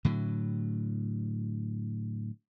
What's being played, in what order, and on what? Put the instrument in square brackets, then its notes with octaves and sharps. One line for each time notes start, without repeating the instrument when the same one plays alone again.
[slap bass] A2 D3 F#3